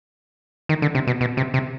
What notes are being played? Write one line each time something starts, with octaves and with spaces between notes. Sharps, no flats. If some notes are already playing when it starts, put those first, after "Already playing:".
D#3
D3
C3
B2
B2
C3
C3